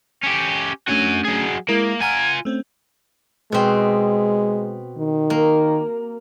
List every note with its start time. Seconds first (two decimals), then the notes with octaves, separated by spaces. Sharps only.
0.24 C#4 G4
0.88 A3 C#4 D4 F#4 G#5
1.25 F#3 G#4
1.69 G#3 A#3 E4 A#4
2.01 F4 F#5 G#5 A#5 F6
2.45 A3 C4 C#4
3.52 B2 G#3 C4
4.98 D#3
5.30 A#3